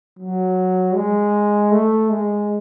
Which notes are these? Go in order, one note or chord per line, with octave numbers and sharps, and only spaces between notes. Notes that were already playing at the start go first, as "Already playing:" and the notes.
F#3
G#3
A3
G#3